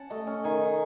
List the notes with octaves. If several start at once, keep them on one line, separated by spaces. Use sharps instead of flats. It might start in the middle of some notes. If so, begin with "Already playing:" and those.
Already playing: C#4 F#5 A5
A3 D#5
C#4
D#3 G#5
D#3